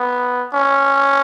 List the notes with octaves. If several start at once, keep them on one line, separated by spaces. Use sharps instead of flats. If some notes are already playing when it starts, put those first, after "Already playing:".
Already playing: B3
C#4